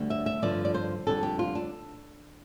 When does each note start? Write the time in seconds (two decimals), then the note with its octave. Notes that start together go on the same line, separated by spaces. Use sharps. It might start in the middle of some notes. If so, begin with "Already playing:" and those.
Already playing: D2 D3 G3
0.10 E5
0.26 E5
0.42 G2 D3 F3 D5
0.65 D5
0.74 C5
1.07 F2 D3 G3 A4
1.23 G4
1.39 F4
1.55 D4